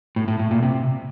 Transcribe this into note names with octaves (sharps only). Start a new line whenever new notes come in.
A2
A2
A2
A#2
C3